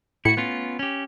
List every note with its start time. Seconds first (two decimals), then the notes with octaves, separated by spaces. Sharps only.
0.25 A2 E4 F#4 C#7
0.37 B3 C#4 F4
0.79 C#4 G4